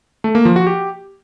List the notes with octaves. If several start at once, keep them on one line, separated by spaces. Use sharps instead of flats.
A3
A#3
F3
F#4
G4